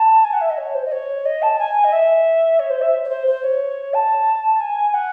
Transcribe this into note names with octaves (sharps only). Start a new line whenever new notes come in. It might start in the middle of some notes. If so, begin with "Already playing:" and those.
Already playing: A5
G#5
F#5
E5
D#5
C#5
C5
D#5
C#5
D#5
A5
G#5
D#5
E5
C#5
C5
E5
C#5
C5
C5
C#5
A5
G#5
F#5